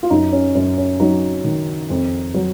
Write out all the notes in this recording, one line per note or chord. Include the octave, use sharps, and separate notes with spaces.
F4
F#2 D#4
C#4
F#2 C#4
C#4
F#3 D#4
D#3
F2
F#3